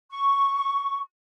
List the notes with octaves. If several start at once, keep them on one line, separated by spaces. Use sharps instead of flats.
C#6